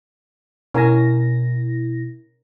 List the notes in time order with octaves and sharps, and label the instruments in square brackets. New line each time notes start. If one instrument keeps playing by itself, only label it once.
[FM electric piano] B2 E4 A#6 [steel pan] C#4 A#4 G#5